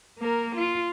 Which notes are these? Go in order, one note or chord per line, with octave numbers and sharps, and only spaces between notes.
A#3 A#4
F4